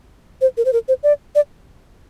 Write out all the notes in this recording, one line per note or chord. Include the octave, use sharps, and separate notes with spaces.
C5
A#4
C5
A#4
C5
D5
D5